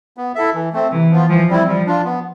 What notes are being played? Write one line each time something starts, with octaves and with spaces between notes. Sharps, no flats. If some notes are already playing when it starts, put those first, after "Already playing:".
B3
E4 A4 E5
E3
A3 C4
C3 E3
F3 B3 F4
E3 F3
G3 C4 E4
F3 G3
D4 F4
B3